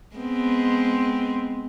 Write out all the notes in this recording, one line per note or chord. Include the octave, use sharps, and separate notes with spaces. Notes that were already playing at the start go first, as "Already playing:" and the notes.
G#3 B3 C4